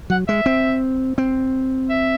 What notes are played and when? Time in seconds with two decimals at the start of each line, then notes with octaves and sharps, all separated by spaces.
0.10 F#3 F#5
0.28 G#3 E5
0.46 C4
1.18 C4
1.90 E5